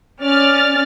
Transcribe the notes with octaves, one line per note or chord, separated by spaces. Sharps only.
C#4 D5 F6 A6